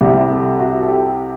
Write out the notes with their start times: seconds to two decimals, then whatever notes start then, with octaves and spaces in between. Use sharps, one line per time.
0.01 C2 C3 G3 G4
0.31 A4
0.59 F#4
0.82 A4
0.88 G4